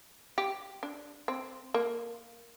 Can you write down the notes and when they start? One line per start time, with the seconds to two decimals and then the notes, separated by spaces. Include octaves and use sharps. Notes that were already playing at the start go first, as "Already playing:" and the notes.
0.38 G4
0.83 D4
1.28 C4
1.74 A#3